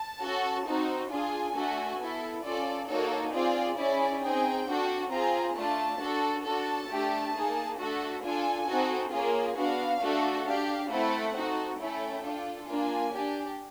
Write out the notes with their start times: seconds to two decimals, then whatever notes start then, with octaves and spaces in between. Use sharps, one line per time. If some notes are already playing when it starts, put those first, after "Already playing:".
Already playing: A5
0.21 C#4 F#4 A4
0.66 C4 D#4 F#4
1.10 D4 F4 G#4 G#5
1.55 A3 D4 F#4 A4
1.99 B3 E4 A4
2.44 C#4 F4 A4 D5
2.88 A#3 D#4 F#4 A4 C#5
3.33 C4 F4 G#4 D5
3.77 C#4 E4 G#4 D5
4.22 C4 D#4 G#4 G5
4.67 D4 F#4 A4
5.11 C4 F4 G#4 A#5
5.56 A3 D4 F4 A5
6.00 D4 F#4 A4
6.45 D4 F#4 A4 A5
6.89 A3 D4 G4
7.34 A#3 D#4 G#4
7.79 A3 D4 F#4 A4
8.22 D4 F4 A4 G#5
8.68 C4 D#4 F#4 A4
9.12 A#3 C#4 F4 G#4
9.56 B3 D4 F#4 F5
10.01 A3 D4 F#4 A4
10.46 D4 G4 F5
10.90 A3 C4 E4 A4 F#5
11.35 C4 D#4 F#4 A4
11.80 A3 C#4 E4 A4 G5
12.24 D4 F4 A4
12.68 A#3 D4 F4 G#5
13.13 D4 G4